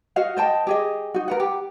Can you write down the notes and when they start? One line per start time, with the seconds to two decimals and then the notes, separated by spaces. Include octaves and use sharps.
0.16 F#4 D#5 F5 F#5
0.37 C5 D#5 G5 A5
0.67 G4 G#4 D#5
1.14 D#4 F#4
1.28 A#4 B4 F#5
1.40 G4